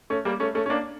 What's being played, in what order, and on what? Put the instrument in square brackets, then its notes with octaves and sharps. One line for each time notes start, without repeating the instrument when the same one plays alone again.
[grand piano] A3 C#4
G3 A#3
A3 C#4
A3 C#4
C#4
A#3 D4